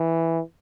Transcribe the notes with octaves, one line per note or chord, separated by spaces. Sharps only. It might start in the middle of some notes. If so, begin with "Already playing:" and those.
Already playing: E3